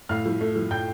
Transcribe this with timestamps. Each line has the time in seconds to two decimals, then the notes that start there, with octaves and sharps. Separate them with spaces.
0.09 A2 F5 F6
0.26 F3
0.41 A3
0.56 F3
0.71 A2 G5 G6